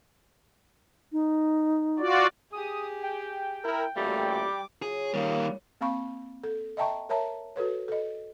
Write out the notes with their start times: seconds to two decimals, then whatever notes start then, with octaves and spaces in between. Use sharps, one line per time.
1.12 D#4
1.99 F4 F#4 D5
2.52 G4 G#4 D#6
3.03 G5
3.64 E4 A#4
3.96 A1 A#2 G3 A3 F#4 F5
4.32 D6
4.82 C#3 F#3 F4 G#4
5.14 D#3 G3 A#3
5.81 A#3 C4 F5 B5 C#6
6.44 A4
6.77 D#5 E5 G5 A5 A#5 C#6
7.09 A#4 C#5 E5 A5 A#5
7.56 F#4 A4 B4 C#5
7.88 A4 D#5